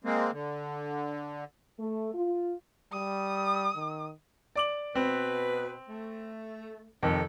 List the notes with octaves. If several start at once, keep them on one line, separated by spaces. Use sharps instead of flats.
G#3 A#3 C4
D3
A3
F4
G3 D#6
D#3
D5 D6 F#7
B2 C4 B4
A3
F2 C3 D#3 C#4 A4